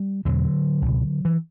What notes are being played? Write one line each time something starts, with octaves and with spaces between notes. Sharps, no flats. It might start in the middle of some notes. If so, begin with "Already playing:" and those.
Already playing: G3
E2 B2 D3 F#3
C#2 B2
E3